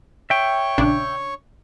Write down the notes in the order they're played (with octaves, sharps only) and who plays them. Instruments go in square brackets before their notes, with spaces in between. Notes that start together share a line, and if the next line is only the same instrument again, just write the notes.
[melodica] C#5 C#6 [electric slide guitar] E5 G5
[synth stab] A#1 C#3 D4